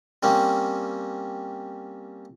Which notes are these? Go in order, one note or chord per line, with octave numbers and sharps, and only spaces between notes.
G3 A#3 C4 C#4